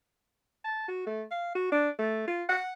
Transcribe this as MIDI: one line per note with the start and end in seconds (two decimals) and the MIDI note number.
0.64 0.84 81
0.88 1.05 66
1.07 1.23 57
1.31 1.50 77
1.55 1.68 66
1.72 1.89 62
1.99 2.26 57
2.27 2.44 65
2.49 2.73 78